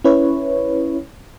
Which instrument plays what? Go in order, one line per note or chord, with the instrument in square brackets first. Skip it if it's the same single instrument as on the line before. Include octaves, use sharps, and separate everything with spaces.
[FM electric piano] C#4 E4 B4 C#5